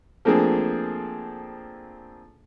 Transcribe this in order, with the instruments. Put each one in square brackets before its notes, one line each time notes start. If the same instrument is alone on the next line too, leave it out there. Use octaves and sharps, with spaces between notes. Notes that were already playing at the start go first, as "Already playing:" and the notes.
[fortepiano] F3 A3 A#3 C4 D4 G#4